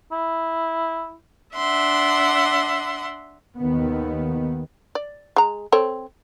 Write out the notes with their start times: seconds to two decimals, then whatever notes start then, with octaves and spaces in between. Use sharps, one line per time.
0.12 E4
1.56 D4 E5 F#5 C6
3.58 D#2 D#3 B3
4.95 D5
5.36 G#3 A#5
5.72 C4 A4 C#5